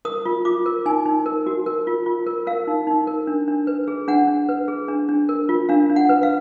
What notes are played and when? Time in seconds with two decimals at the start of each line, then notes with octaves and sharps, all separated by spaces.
0.05 A#4 D#6
0.26 F4
0.45 F4 D6
0.66 A#4
0.86 D#4 G#5
1.06 D#4
1.26 A#4
1.47 F#4
1.66 A#4
1.87 F4
2.06 F4
2.26 A#4
2.47 A#4 F5
2.67 D#4
2.87 D#4
3.07 A#4
3.27 D4
3.48 D4
3.67 B4
3.88 G#4
4.08 D4 F#5
4.28 D4
4.49 B4
4.68 G#4
4.88 D4
5.09 D4
5.29 A#4
5.49 F4
5.69 D4 F5
5.90 D4
5.96 F#5
6.09 B4
6.23 F5